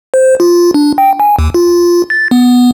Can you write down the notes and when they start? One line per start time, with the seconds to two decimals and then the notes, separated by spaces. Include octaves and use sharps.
0.14 C5
0.40 F4
0.74 D4
0.98 G5
1.20 G#5
1.39 D#2
1.54 F4
2.10 A6
2.31 B3